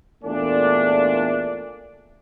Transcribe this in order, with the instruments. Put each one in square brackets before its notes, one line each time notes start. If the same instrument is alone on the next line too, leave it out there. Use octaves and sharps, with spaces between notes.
[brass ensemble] E2 A#2 A3 D4